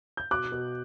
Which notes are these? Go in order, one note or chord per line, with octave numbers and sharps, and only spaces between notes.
G6
B2 D6 F#6
B2